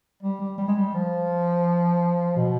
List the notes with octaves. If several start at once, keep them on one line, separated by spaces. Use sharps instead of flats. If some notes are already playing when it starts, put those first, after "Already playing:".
G3
G3
G3
G#3
G3
F3
B2